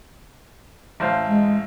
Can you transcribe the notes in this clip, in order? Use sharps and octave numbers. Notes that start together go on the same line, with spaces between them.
A1 C5 F5
G#3